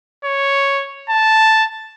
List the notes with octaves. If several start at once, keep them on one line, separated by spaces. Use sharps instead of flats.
C#5
A5